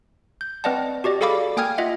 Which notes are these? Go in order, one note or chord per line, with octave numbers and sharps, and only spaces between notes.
G6
C4 B4 D5 D#5 F#5 A5
F#4 G4 D5 D#5
G#4 A4 D5 F5 B5 D6
A#3 G5 G#5 D#6 F6 G#6
F4 D#5 E5 F#5